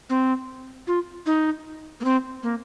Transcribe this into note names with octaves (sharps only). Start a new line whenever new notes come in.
C4
F4
D#4
A#3
C4
A#3